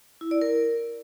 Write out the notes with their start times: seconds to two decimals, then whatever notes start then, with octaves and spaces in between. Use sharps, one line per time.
0.21 E4
0.31 D5
0.41 A#4